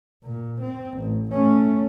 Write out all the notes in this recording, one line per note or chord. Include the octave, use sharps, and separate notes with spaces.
A#2
C4
A1
A3 C#4